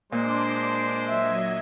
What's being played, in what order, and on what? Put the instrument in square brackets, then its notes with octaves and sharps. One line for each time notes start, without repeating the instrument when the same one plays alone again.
[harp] A#2 [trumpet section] G#3 C5 [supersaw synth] D4 C6 D6
[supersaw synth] F#3 D#5 G#6 [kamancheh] E5